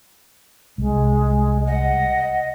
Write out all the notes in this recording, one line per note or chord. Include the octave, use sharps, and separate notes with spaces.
C2 G#3
D#5 F#5